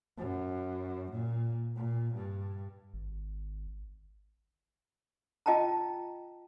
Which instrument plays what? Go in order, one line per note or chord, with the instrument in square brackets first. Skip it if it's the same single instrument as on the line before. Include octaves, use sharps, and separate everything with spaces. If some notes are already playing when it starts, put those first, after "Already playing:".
[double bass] F#2
A#2
A#2
G2
[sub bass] G#1
[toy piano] F4 D#5 G5 A5 A#5